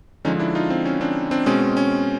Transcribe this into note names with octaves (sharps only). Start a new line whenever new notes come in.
D3 F3 G#3 C#4 D#4
D4 E4
D#4 F4
C4
C#4
C4 D4
C4 D4
B2 G#3 C4 C#4
C#4